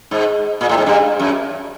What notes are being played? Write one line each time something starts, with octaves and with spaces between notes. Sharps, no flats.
G#2
A#2
A2
G#2
G2
F#2